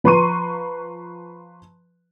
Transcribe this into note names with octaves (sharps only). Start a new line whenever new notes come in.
F3 B4 A#5 C6 C#6 D#7